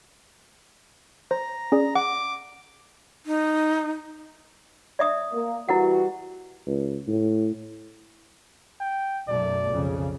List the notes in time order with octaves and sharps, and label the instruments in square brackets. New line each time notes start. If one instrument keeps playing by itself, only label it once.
[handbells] C5 [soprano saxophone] A#5
[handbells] C#4 G#4 D5
[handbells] F#5 [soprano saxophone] D6
[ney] D#4
[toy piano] D5 E5 D#6
[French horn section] A#3
[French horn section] E3 G3 F#4 [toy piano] E4 A#4 F#5
[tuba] C#2
A2
[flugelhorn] G5
[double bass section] B1 F#2 A3 [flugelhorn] D5
[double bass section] F2 C#3